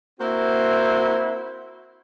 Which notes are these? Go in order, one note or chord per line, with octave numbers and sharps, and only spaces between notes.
A#3 C4 E4 F#4 C5